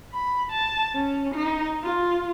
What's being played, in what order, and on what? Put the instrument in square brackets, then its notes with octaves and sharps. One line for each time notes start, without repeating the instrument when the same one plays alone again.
[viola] B5
A5
C#4
D#4
F4